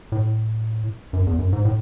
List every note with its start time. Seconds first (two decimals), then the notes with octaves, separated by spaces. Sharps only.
0.12 A2
1.13 F#2
1.27 E2
1.39 F#2
1.53 G#2
1.65 A2